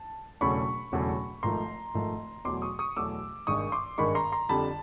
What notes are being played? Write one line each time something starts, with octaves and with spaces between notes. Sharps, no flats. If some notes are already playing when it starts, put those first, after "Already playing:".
Already playing: A5
E1 E2 C#3 F#3 A3 B5 C#6
E1 E2 C#3 F#3 A3
G#1 G#2 F3 A3 A#5 C6
G#1 G#2 F3 A3
E2 B2 F#3 A3 C6 D6
C#6 D#6
C#6 D#6
E2 B2 F#3 A3 D6 E6
G#1 G2 D#3 G#3 C#6 D#6
C6 D6
G#1 G2 D#3 G#3 B5 C#6
A#5 C6
A#5 C6
F2 D3 G3 A5 B5